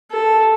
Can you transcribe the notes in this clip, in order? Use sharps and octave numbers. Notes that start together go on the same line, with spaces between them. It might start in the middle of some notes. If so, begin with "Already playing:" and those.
A4